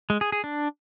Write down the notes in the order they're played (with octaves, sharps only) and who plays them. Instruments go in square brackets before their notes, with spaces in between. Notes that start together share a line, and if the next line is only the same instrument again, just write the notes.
[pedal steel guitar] G#3
G#4
G#4
D4